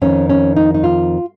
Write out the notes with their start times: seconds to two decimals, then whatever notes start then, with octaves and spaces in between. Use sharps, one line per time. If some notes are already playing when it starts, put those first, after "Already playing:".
0.02 F2 D#3 C#4
0.30 C#4
0.57 D#4
0.74 D#4
0.84 F4